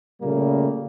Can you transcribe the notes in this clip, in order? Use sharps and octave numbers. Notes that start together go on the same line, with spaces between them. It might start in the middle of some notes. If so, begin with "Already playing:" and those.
A#2 C#3 G3 A3 A#3